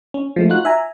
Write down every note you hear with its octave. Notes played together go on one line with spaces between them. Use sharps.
C#4
F3 G#3 A3
D#4 F4 F#4 F#6
E5 G#5 A#5